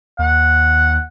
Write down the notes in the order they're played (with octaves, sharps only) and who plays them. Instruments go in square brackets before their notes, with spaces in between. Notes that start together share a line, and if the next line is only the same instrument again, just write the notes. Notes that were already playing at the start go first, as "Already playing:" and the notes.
[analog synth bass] D#2 [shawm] F#5